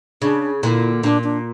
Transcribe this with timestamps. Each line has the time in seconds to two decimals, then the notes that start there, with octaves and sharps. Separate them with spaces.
0.22 C#3 D4
0.63 A#2 D3 E4
1.03 A#2 D4
1.24 D4